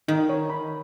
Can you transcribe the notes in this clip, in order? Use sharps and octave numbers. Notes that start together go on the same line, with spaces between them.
D#3 D#4
C#5
B5